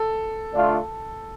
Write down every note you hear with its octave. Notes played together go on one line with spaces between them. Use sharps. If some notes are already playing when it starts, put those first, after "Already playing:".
Already playing: A4
D3 A3 D4 F4